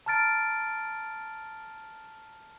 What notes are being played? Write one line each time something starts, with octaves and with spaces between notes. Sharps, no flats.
A5 A#5 F6 A6 D7